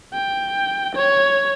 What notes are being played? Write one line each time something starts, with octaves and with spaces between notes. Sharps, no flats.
G5
C#5